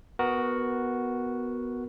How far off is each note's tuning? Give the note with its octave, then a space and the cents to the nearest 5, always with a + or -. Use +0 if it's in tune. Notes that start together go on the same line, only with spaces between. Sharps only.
B3 +0 F#4 +0 A#4 +10